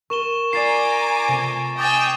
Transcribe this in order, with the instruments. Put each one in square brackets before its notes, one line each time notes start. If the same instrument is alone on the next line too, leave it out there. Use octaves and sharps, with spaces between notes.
[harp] A#4 [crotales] C#6 E7 G7
[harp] F4 D5 [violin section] G#5 A#5 D6 [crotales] A6 C7
[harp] C3 A3 E7
[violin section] D#5 G5 G#5 [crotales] D6 D#6 A6